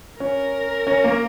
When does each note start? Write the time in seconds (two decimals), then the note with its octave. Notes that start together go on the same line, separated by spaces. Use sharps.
0.19 C#4 A#4
0.87 C#4
1.04 A#3